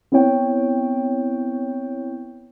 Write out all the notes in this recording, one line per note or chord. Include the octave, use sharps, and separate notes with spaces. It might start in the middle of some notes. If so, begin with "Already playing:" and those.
B3 C4 E4 C#5 G5